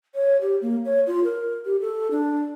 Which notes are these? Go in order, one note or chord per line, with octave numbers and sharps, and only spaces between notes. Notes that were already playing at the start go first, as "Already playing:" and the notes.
C#5
G4
A#3
C#5
F4
A#4
G4
A4
D4